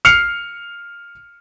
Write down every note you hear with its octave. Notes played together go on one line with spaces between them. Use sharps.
F6 C7 C#7 F7